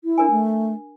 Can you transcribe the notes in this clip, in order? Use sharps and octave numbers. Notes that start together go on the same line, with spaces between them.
E4
D4 A#4 G#5
A3